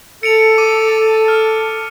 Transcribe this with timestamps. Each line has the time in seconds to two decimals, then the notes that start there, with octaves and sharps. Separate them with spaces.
0.23 A4 C#7 D7 F7
0.58 D6 D#7
1.28 F6